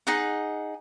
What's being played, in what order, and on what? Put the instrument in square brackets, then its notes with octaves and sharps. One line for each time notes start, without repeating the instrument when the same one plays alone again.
[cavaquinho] D#4 G#4 F#5